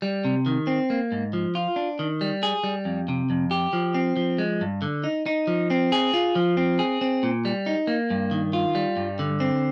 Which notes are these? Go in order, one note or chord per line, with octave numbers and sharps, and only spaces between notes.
G3
C3
D#3
C4
A#3
G#2
F3
F4
D4
D#3
G3
G#4
G3
F2
C3
F2
G4
F3
C4
F3
G#3
G2
D3
D#4
D#4
F3
C4
G#4
F4
F3
C4
G#4
C4
A#2
G3
D#4
A#3
G2
D#3
F4
G3
G2
D3
C4